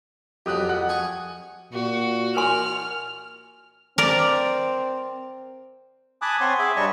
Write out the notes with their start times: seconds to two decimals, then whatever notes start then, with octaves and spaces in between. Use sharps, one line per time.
0.46 F2 F#3 G4 D#6 F#6
0.69 F2 F#5 F#6
0.89 G#4 G#5 C#6
1.73 A#2 F#4
2.36 A#4 G#5 C6 F6
3.98 C4 A#4 D5
6.22 G#5 A5 B5 D6 D#6 F#6
6.41 C4 C#5 F#5 G#5 C6
6.59 G#4 E5 G#5 B5 D6
6.76 G2 G3 C#5 D#5 A5 C#6